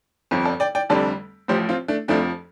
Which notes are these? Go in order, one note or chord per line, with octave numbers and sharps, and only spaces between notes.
G1 F2 F3
A4 D5
D5 G5
D5 G5
F1 F2 D3 G3 A4 D5
A1 A2 F3 G4 C5
C4 F4
A3 D4
F1 F2 F3 A3 D4